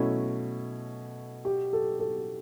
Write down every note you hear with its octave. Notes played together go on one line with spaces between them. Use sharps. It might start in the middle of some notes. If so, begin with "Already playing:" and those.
Already playing: B2 F#3 A3 C#4 E4 A4
G4
A4
A4